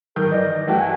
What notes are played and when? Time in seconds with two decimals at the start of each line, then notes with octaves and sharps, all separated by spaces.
0.16 D#3 A#4 G6
0.31 E3 D5 D#5
0.67 E3 A3 F#4 G5
0.79 G#5